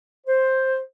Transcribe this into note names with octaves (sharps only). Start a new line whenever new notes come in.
C5